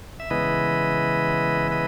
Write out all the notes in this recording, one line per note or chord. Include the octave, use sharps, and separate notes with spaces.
E5
C#3 E3 G#3 B3 E4 B4 D#5
B4 D#5